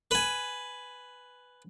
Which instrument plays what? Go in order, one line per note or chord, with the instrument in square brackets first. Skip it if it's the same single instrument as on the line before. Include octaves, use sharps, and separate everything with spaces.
[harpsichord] B4 G#5